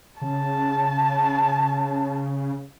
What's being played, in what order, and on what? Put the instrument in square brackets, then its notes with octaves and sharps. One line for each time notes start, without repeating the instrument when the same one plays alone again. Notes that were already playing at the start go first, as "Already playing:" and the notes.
[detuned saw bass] C#3 [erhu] A5